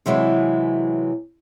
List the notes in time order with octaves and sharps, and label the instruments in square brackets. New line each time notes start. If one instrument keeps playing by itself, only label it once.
[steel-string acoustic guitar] C3 E3 F#3 G#3